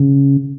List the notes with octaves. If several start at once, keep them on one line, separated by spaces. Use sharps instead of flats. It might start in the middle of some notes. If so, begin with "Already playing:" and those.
Already playing: C#3